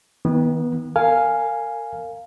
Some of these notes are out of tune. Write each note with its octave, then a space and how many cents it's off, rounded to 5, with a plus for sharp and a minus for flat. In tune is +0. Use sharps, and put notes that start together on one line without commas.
D#3 +30 B3 -20
A#4 -30 F5 +0 G#5 +0